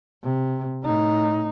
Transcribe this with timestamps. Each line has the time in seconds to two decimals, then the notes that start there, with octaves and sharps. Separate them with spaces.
0.23 C3
0.83 A2 D#4